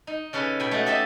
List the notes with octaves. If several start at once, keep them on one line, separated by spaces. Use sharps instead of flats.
D#4
C#3 C#4 A4 B4
B2 G5 G#5 B5
A3 D#4 F#4
G4 A4 D#5 E5 A5